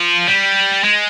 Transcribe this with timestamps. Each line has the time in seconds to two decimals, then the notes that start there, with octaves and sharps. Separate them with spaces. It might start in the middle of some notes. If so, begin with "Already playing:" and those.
Already playing: F3
0.28 G3
0.84 G#3